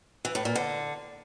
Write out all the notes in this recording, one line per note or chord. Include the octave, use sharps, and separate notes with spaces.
E3
A2
A#2
D3